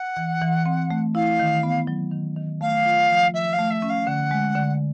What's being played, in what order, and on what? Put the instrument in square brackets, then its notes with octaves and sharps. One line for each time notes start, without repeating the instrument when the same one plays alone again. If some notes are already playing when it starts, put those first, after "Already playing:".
Already playing: [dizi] F#5
[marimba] E3
E3
C4
A3
[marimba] E4 [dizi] F5
[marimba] D#3
B3
F#3
D#3
D#3
[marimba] A3 [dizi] F5
[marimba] F4
F3
[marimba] F3 [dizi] E5
[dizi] F5
[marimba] A3
[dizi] E5
[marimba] C#4
[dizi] F5
[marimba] D3 [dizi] F#5
[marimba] G#3
D3